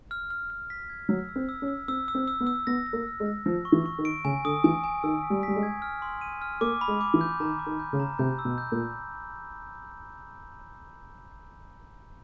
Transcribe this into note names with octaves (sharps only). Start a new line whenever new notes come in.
F6
F6
F6
B6
G#6
F#3 E6
E6
C4
E6
C#4
E6
C4 E6
E6
C4
E6
B3
E6
B3 A#6
A#6
A#3
F6
G#3
A#6
F3 A#6
C#6
E3
C#6
D#3
D7
C#3 G#5
D3 D#6
E3 G#5
G#5
D#3 E6
B6
G3
G3 B6
G#3
G#6
F6
C6
D#7
F6
A#3 D6
B5
G#3
D6
E3
G6
D#3 A#5
D6
D#3
G6
C#3
A#5
C3 G6
E6
B2
G6
A#2